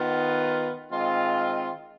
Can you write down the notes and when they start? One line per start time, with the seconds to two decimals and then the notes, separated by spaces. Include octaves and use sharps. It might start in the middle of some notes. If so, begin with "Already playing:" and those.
Already playing: D#3 B3 F4
0.91 D#3 G#3 C4 F4